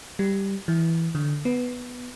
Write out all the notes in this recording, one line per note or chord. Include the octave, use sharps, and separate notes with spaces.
G3
E3
D3
B3